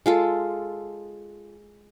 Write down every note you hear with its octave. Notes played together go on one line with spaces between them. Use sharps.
G#3 F4 A4